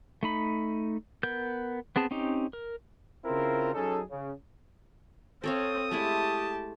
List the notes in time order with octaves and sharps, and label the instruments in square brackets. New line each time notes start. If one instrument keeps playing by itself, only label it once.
[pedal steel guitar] A3 D#4 B5
B3 A#4 G6
B3 C4 G#4 A5
C4 C#4 D#4 G4
A#4
[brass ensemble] C#3 C4 E4 F4 A#4
F#3 C#4 D#4 G#4 A4
C#3
[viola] C4 [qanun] A4 C#5 F5 [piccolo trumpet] D#6
[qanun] G#3 A3 E4 [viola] G4 A5